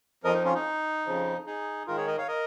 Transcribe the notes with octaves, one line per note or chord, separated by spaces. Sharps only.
F2 F3 A#4 D#5
D#4
C#4 F4
D#4
F2 C#3 F3
D#4 G#4
G#2 D#3 F4 A#4
G#4 C#5
A#4 D#5
C#5 F5
A#4 D#5